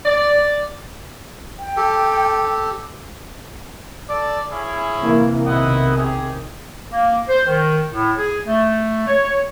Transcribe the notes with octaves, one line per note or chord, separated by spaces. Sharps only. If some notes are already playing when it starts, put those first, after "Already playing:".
D5
G5
G4 A4
A4 D5
C#4 E4 G#4
C3 E3 A#3
B1 C3 D#3 E4 D#5 F#5
G4 G#4
A#3
C5
D#3
A2
G#4
A3
C#5